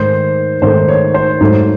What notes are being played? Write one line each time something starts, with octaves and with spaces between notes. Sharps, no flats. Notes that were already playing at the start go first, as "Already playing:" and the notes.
Already playing: G#2 D#3 A3 C5
G#2 D#3 A3 C5
C#5
C5
G#2 F#3 A3